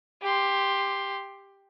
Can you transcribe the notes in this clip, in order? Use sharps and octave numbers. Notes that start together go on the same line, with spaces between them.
G4 C6